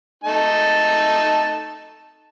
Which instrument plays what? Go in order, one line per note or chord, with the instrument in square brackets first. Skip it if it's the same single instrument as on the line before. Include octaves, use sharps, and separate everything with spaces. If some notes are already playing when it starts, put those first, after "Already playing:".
[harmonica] A3 D#4 A5